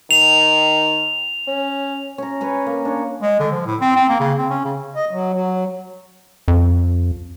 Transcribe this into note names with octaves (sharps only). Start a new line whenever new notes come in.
D#3 F7
C#4
C#4 A#5
B4 C#5 G#5 A#5
A#3
D4 C#5
G#3
D3
F3
A2
C4
C4
A#3
C#3
C4
C#4
C#3
D#5
F#3
F#3
F2